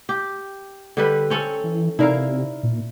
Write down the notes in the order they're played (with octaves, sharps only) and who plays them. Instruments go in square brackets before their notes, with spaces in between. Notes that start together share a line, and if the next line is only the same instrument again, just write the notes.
[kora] G4
D3 G3 B4
C4 C#4 A4
[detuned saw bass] E3
[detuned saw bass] C3 [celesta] D#4 D5 [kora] E4 A#4 F5
[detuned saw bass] A#2